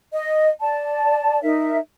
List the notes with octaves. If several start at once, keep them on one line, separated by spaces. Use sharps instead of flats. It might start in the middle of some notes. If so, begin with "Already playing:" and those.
D#5
D5 A5
D#4 A#4 E5